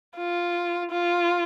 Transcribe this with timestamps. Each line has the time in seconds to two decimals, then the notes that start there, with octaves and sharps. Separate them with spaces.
0.17 F4
0.90 F4